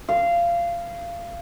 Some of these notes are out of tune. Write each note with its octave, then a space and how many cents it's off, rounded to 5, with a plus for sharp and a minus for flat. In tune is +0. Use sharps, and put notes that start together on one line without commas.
F5 -20